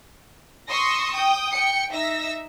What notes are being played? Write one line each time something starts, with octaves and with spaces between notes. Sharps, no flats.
C6 C#6 D#6 E6 A#6
G5 D#6
G5 C#7
D#4 E5 E6 A#6